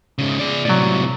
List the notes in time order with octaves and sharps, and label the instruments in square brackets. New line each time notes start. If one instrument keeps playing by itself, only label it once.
[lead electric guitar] G#2 C#3
G#4 D5
[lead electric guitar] A2 C3 [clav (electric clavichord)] F#3 D5